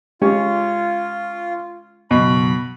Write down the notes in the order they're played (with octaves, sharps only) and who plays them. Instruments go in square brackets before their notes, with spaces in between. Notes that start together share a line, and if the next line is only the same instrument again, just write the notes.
[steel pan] G#3 G4 [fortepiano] C#4 [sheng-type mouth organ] F4
[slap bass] F#1 B1 [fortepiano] B2 [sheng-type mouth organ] B5